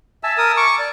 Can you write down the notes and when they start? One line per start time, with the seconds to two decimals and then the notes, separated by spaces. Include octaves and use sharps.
0.23 E5 G#5 A5 E6
0.38 A#4 D#6
0.57 C#6 D6
0.79 D5